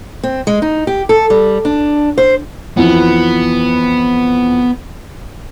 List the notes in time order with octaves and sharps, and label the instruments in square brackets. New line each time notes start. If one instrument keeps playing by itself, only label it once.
[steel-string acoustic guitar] C4
G#3
D#4
G4
A4
G3
D4
C5
[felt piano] F2 E3 [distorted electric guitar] B3